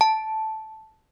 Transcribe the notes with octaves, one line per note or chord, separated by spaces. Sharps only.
A5